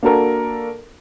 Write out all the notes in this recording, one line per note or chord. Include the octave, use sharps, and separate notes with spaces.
A#3 D4 F#4 A4 A#4